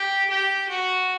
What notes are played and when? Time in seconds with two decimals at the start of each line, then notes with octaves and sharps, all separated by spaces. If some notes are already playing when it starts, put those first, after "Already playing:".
Already playing: G4
0.30 G4
0.69 F#4